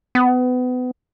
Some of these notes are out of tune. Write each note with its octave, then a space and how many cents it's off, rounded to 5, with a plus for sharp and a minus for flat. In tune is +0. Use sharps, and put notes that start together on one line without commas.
B3 +30